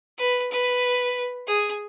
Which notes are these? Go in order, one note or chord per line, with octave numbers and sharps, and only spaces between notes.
B4
B4
G#4